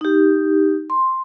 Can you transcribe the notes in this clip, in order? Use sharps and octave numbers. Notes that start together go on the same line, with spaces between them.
D#4 G4
C6